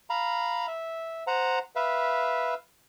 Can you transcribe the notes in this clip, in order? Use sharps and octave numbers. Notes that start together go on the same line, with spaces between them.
F5 A#5 B5
E5
C5 F#5 A#5
B4 E5 F5